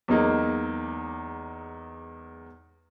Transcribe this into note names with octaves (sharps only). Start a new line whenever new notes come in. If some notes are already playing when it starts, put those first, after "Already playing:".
E2 F#3 G#3 A#3 D#4